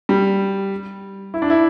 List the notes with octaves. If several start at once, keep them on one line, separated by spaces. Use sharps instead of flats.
G3
E4
D4
E4